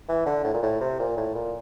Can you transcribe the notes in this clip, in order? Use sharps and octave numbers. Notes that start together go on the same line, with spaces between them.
E3
D3
A2
A#2
A2
C3
A#2
A2
A#2